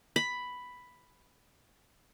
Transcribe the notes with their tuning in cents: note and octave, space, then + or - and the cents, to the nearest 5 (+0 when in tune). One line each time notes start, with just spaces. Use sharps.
B5 +5